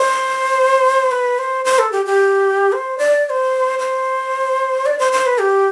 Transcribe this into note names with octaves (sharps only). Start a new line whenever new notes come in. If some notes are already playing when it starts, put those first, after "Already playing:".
Already playing: C5
B4
C5
C5
A4
G4
G4
C5
D5
D5
C5
C5
D5
C5
C5
B4
G4